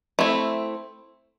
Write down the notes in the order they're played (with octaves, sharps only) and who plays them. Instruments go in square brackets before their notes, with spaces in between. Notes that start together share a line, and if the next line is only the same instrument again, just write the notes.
[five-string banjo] A3 C4 E4